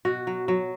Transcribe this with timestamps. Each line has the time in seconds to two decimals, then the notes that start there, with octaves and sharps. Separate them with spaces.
0.05 B2 F#4
0.27 F#3
0.48 F#3